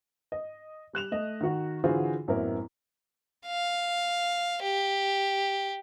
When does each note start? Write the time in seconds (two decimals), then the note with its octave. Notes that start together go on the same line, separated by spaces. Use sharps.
0.32 D#5
0.93 G3 F#6 E7 F7
1.12 A3 D#5
1.41 D#3 F#4
1.84 D3 E3 F4 F#4 G#4 C5
2.28 A1 F#2 B3 C4 E4 A#4
3.46 F5
4.63 G4